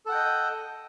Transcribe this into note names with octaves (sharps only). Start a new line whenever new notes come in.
A4 D#5 F#5 G5